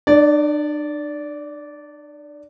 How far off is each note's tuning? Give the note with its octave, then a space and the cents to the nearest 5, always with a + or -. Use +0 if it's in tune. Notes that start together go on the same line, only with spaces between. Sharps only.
D4 +40 D5 -15